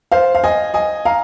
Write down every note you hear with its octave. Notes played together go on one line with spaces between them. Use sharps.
C5 F5
F5
D#5 G#5
D#5 G#5
F5 A#5